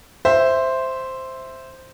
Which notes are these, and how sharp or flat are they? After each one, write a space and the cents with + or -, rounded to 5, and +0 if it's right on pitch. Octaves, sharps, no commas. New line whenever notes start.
C5 +0 E5 +0